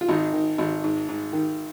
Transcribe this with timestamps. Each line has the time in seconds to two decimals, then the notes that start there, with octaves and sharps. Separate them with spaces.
0.01 F4
0.08 G#1 D#4
0.33 D#3
0.58 G#1
0.84 G#2
1.09 G#2
1.33 D#3